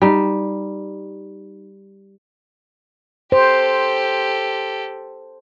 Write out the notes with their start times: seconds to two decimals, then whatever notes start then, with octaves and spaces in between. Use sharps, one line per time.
0.02 G3 D#4
3.32 G4 A4 C5